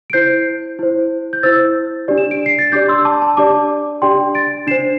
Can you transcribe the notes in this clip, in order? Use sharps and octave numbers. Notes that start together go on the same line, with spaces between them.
D7
E4 C5 G6 C7
E4 C5
G6
E4 C5 E6 A6
D4 G4 D5
E7
D7
C7
A6
D4 G4 D5 D6 G6
C6 E6
A5 D6
A5
D4 G4 D5 A5 D6
D4 G4 D5 G5 C6
A6 D7
D4 C5 C7 E7